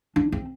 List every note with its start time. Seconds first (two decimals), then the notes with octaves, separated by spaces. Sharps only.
0.16 D4
0.32 C4